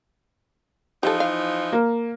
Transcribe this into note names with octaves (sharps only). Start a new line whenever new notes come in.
E3 F3 D#4 G4 A4
F5
A#3